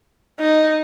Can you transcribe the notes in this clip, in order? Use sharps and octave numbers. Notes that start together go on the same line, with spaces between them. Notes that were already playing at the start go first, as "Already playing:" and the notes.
D#4